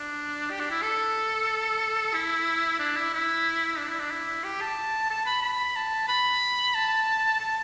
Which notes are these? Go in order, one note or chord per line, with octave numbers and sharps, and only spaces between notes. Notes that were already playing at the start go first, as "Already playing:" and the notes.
Already playing: D4
G4
D4
E4
A4
E4
D4
E4
E4
D4
E4
D4
E4
G4
A5
A5
B5
B5
A5
B5
A5
A5